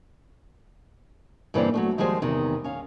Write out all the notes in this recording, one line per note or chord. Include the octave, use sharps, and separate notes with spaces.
G2 C#3 E3 A#3 C4 D5
F#3 G#3 A3
D#3 F3 G3 G#3 G#4 C5
E2 C3 D#3
C#4 F5